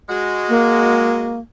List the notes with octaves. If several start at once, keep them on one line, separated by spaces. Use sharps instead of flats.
G#3 F#4
A#3